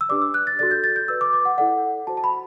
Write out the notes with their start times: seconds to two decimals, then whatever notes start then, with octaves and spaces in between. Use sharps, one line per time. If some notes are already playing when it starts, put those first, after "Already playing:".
0.01 E6
0.09 D4 G4 B4 D5 D6
0.22 E6
0.34 F#6
0.47 A6
0.59 F#4 A4 D5 A6
0.71 G6
0.84 A6
0.96 G6
1.08 F#4 B4 D5 E6
1.21 D6
1.33 D6
1.45 F#5
1.58 E4 A4 D5 F#5
2.07 F#4 C5 A5
2.17 A5
2.24 B5